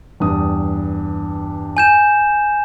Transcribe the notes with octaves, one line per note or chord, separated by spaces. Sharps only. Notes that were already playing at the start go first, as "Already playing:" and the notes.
E2 G2 D#6
G#5 G6 E7